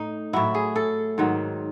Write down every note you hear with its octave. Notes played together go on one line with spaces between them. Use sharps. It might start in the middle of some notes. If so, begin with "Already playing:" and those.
Already playing: A2 D#4
A2 F#3 E4
G#4
A4
G#2 D#3 F#3